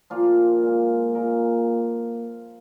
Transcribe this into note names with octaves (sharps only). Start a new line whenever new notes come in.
A#2 F3 A#3 F4
A#2 G#3
A#2 G#3 A#4